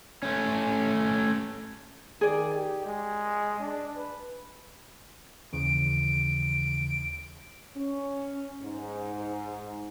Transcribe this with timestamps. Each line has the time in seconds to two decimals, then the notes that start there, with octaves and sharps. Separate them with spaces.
0.23 A3 C#4
2.21 D#3 G#4 D5
2.54 G4
2.86 G#3
3.60 D4
3.96 B4
5.53 D#2 C#3 E3 D7
7.76 C#4
8.61 G#2